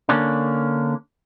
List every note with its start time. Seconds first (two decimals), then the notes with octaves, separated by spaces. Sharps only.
0.09 D3 A#3 C#4 D4